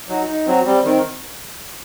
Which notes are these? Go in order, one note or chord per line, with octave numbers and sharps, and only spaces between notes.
F#3 D#4
D#4
F#3 C4
G3 C4
D#3 C4